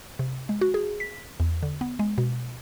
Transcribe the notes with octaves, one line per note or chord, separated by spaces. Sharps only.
C3
G#3
F#4
G#4
B6
E2
D3
B3
G#3
B2